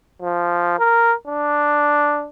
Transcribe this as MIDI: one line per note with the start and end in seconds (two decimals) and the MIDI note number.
0.22 0.75 53
0.79 1.13 70
1.27 2.28 62